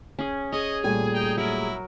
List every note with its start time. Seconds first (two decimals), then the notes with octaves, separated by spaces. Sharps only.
0.19 C#4 G#4
0.52 G#4 C#5 D#5
0.84 A#2 G3 A3 G#5
1.14 D#4 G5
1.37 F#3 E4 A#4